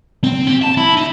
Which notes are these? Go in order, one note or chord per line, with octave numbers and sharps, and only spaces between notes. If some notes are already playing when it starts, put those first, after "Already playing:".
C4
G4
A5
E4
D#4